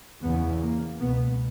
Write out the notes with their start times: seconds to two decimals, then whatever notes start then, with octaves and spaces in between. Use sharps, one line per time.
0.22 E2 C#3 B3
0.61 A#3
1.00 C#2 B2 B3